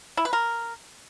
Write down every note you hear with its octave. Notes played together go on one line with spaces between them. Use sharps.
E4
B4
A#4